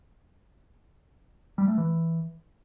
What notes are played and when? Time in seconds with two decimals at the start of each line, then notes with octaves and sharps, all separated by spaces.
1.58 G3
1.68 A3
1.78 E3